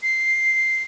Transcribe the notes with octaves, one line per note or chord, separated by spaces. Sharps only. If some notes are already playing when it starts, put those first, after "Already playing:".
C7